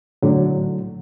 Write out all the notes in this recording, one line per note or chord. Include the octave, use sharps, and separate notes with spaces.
A2 D3 F#3